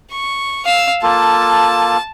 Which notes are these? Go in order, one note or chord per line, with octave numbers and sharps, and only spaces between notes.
C#6
F5 E6
A#3 F4 A4 A5